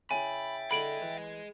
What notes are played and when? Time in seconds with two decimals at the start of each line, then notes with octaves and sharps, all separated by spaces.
0.11 C#3 E4 E5 G5 G#5 B5 A6
0.71 D3 E4 G#4 D#5 B5 D7 F#7
1.02 E3